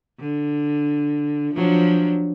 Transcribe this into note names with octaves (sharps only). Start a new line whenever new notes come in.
D3
F3 F#3 D4